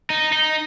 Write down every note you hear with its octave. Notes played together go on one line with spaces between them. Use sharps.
D#4
D#4